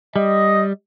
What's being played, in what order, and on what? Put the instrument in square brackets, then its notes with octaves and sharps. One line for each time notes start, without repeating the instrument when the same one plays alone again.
[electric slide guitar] G3 [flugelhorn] D#5